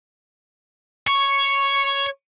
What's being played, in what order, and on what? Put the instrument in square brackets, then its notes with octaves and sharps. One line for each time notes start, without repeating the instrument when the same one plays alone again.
[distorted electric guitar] C#5 [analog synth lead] C#6